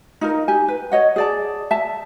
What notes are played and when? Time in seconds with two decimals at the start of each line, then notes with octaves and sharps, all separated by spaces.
0.21 D#4 F4 A#4
0.48 G4 G#5
0.68 B4
0.92 C#5 D#5 F#5
1.16 G#4 D5 A5
1.71 E5 A5